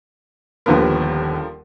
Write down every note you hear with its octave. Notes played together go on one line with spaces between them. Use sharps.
D#1 D#2 D3 F3 B3 A#4